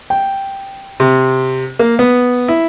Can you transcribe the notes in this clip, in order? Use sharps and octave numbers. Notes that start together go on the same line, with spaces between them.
G5
C3
A#3
B3
E4